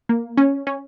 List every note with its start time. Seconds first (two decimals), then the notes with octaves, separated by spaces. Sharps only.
0.09 A#3
0.37 C#4
0.67 C#4